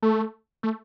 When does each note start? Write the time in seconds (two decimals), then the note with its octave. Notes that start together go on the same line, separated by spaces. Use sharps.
0.02 A3
0.63 A3